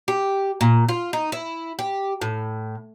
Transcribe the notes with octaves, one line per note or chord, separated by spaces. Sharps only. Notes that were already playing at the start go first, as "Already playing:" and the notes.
G4
A#2
F4
D#4
E4
G4
A2